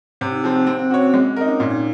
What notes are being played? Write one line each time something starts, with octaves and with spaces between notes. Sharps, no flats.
C3 C4
D#4
F3 C4 G#4
C4
A#3 C4
C4
C#4 F#4 C#5
C4
G#3 C4
A#3
C4 D#4 A#4
C#4
A#2 D#4
D#4